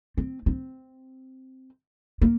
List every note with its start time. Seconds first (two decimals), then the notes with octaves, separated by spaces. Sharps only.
0.17 C4
0.46 C4
2.21 A#3